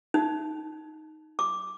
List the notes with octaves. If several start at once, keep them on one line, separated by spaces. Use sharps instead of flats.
D#4
D6